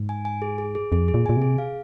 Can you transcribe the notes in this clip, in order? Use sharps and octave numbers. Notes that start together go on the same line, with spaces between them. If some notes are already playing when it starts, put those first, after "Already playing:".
Already playing: G#2
G#5
G#5
G#4
G#4
G#4
F2 G#4
G#4
A#2
A#2 G#5
C3
G#4
F5